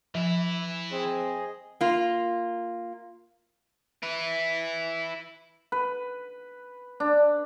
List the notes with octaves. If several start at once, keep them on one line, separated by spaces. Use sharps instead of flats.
E3 F3 E4
C4 G#4 D#5
A#3 F4
E4 B4
B4
D4